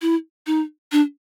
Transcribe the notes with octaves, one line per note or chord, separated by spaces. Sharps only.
E4
D#4
D4